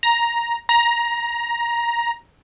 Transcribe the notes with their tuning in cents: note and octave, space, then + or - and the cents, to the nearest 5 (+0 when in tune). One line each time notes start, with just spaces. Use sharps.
A#5 +10
A#5 +15